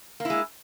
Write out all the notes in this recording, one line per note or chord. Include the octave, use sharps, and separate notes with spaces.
G#3 A#3 E4